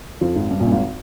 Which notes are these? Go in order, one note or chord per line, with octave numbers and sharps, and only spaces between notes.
F2 F3
G#1 G#2
G2
A#1 A#2
G2
G#1 G#2